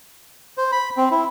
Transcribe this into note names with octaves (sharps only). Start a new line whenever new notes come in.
C5
B5
C4
E4